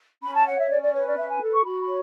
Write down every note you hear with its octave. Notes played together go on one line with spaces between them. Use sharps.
C#4 B5
A5
C#5 F#5
E5
C#4 D5
D5
B4 C#5
D5
C#4 E5
G#5
A4
C#6
F#4 B5
B5
C#5